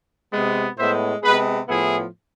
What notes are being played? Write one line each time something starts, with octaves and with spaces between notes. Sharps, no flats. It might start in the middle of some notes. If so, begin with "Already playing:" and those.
C3 G#3 B3
A2 G#3 B3 C5 E5
C3 G#3 B3 G#4 B4
A2 F3 B3 E4 G#4